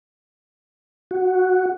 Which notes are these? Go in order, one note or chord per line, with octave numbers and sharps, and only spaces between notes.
F#4